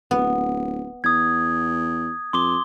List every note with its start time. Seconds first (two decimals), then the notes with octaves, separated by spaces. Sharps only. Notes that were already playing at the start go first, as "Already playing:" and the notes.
0.11 D1 B3
1.04 E2 D#6 G#6
2.33 F2 C6 D6 G7